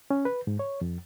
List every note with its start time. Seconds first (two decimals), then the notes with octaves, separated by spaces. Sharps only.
0.10 C#4
0.25 B4
0.47 G#2
0.59 C#5
0.81 F2